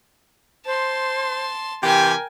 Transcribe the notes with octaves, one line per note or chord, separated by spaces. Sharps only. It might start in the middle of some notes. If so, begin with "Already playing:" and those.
C5 A5 C6
C3 E3 G4 A#4 G5 G#5